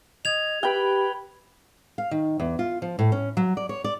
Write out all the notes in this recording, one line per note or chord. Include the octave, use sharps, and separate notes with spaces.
D#5 G#6 F7
G4 B4 G5 B5
F5
D#3
E2
F4
F3
A2
C#4
F#3
D5
C#5
D5